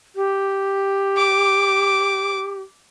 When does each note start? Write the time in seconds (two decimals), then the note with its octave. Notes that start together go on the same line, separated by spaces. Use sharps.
0.16 G4
1.17 D6